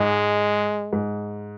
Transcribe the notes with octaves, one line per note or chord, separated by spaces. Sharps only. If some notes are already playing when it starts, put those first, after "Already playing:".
Already playing: G#2 G#3
G#2